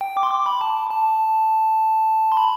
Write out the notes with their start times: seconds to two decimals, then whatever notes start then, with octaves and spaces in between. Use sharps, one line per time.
0.01 G5
0.17 D6
0.23 C6
0.31 D6
0.46 B5
0.61 A5
0.90 A5
2.32 C6
2.37 B5